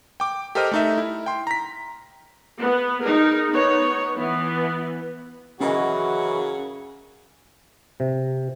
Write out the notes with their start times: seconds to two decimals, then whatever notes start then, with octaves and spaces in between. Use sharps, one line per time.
0.20 G5 D6
0.55 G4 A4 A#4 C5 D#5 F6
0.71 A3 D#4 E5
0.98 E4
1.26 G5 C6
1.47 A#5 B6
2.59 B3
3.01 D#4 G#4 A#4
3.52 B3 D#4 C#5
4.15 E3 B3
5.61 C#3 E3 F#3 C#4 E4 F#4 A#4 D#5
8.00 C3